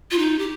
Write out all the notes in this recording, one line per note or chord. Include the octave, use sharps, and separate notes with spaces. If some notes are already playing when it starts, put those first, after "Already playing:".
F4
D#4
G4